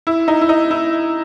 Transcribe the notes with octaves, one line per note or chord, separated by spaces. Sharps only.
E4
D#4
E4
D#4
E4